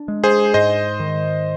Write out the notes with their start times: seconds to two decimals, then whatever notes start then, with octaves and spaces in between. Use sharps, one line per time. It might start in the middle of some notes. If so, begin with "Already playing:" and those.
Already playing: D4
0.08 G#3
0.24 G#4 C5
0.54 G#2 C5 D#5
1.00 D#3